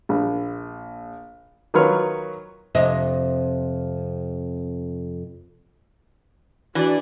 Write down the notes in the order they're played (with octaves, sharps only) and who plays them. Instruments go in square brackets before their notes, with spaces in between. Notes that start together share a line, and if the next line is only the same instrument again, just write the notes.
[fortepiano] A#1
D#3 F#3 F4 B4 C#5 F6
[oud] F2 C3 D#5
[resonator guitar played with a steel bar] E3 [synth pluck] D4 D5 [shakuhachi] F#4